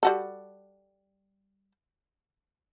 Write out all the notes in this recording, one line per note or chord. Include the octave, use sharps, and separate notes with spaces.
G3 F#4 A4